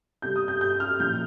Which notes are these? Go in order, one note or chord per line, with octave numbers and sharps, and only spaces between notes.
C3 G3 G6
D#6
G6
G6
F6
A#2 F3 G6